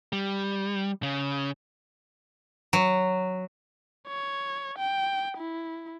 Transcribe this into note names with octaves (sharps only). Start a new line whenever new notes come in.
G3
C#3
F#3
C#5
G5
E4